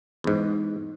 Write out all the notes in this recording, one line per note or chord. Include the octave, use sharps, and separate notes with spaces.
E2 G#2